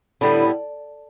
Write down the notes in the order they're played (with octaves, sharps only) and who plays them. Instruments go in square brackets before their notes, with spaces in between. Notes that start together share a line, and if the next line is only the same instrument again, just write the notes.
[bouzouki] A2 G3 B3 E4 [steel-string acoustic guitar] D3